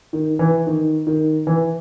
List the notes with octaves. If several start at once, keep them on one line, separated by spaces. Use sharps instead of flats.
D#3
E3
D#3
D#3
E3